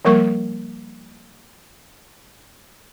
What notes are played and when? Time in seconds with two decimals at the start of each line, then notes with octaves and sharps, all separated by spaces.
0.05 F3 G3 A#3 A#4 C#6